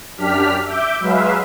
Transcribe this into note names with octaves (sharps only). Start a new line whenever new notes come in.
F#2 D4 G4 F6 B6
E5 D6 G6
F#3 G#3 B4 E5 F5